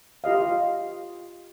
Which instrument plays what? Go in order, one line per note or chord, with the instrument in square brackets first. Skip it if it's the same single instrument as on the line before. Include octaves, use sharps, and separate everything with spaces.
[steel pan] F4 G4 D#5 F5